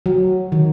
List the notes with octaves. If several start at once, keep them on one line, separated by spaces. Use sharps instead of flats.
F#3
D#3